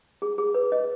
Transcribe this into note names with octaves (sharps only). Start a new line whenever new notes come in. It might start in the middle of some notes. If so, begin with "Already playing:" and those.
G#4
G#4
B4
D#5